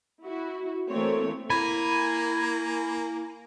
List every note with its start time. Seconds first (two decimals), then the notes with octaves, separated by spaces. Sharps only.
0.25 E4 F#4
0.89 E3 A3 A#3 C4 C#5
1.50 A#3 E4 G#5 B5